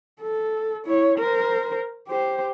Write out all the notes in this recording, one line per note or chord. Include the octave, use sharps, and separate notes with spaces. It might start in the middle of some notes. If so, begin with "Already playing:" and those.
A4
E4 C#5
A#4 C5
G4 C5